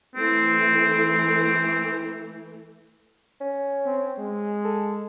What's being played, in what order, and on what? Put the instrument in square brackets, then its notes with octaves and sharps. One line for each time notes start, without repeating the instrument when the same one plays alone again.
[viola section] E3 A3 [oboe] C4
[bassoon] C#4
[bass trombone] C4
G#3
[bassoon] A4